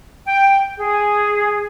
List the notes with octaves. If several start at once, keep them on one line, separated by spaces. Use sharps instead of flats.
G5
G#4